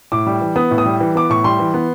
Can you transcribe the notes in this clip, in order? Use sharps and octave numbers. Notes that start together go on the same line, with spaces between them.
A2 D6
G3
E3
B3 D#6
A2
D#6
G3
E3
B3 D6
A2 C#6
G3 C6
E3
B3